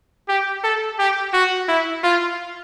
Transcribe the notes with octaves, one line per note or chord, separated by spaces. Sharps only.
G4
A4
G4
F#4
E4
F4